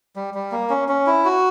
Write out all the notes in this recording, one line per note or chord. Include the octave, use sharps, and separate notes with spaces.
G3
G3
A#3
C#4
C#4
E4
F#4